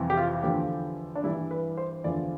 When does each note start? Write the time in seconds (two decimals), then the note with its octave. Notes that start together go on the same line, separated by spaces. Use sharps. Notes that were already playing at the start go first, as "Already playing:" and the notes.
Already playing: F2 C3 E3 G3
0.10 G4
0.17 F4
0.43 E2 D3 F3 G4
1.16 D4
1.24 G2 E3 G3 E4
1.51 B4
1.77 C5
2.04 E2 D3 F3 D5